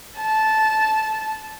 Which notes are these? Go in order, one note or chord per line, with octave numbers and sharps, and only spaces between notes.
A5